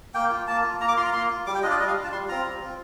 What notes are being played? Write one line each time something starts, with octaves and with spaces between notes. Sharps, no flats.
A#3 G5
F4
A#3 A5
F4
A#3 A#5
D6
F4 C6
A#5
A#3 C6
F4
G3 D6
G5
D4 F4 D#5
D5
G3 D#5
F5
D4 F4
A5
G3 C6
C4 F4 A#5
G3
C4 F4